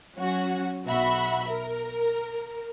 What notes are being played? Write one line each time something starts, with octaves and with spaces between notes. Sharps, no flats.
F#3 C#4 F#4
B1 F#4 E5 B5
A#4